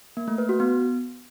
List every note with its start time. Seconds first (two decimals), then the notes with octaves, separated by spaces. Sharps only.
0.17 A#3
0.28 A3
0.38 B4
0.49 F#4
0.60 B3